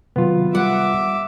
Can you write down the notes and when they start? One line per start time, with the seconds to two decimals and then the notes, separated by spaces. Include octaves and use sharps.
0.16 C3 D#3 F#3 B3 F4
0.55 G3 E5 F#5 D6